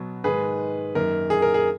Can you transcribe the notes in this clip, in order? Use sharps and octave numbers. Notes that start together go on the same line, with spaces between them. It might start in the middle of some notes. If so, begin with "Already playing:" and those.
Already playing: B2 F#3 B3
G#2 D#3 G#3 G#4 B4
F#2 D#3 A#3 A#4
G#4
A#4
G#4